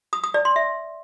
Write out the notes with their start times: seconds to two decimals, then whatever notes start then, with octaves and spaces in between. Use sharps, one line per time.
0.13 D#6
0.24 D#6
0.34 D5
0.45 C6
0.56 E5